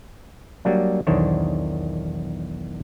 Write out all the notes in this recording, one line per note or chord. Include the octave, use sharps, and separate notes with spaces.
F#3 G3 A#3 D4
B1 E2 D#3 D4 C5 C#5